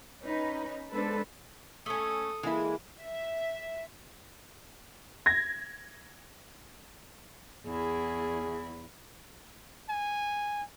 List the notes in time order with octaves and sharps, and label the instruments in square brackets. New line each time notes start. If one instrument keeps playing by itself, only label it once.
[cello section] C#4 D#4 B4
G#3 B3 D4 A4 B4 C5
[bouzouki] A3 C#4 [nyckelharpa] A4 D#6
[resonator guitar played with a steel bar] E3 A#3 E4 [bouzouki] G#3
[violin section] E5
[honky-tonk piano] G#6 A#6
[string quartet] E2 E4 [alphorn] G#4
[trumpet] G#5